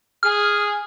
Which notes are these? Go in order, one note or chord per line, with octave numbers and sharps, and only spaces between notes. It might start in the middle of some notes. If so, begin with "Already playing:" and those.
G#4 F6